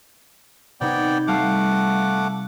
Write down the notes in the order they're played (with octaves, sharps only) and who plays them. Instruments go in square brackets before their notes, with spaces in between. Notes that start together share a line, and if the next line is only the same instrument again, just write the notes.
[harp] C3 D#4 G#6 [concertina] B3 D5 G5
[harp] G3 F5 C7 [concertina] A3 F#5 D6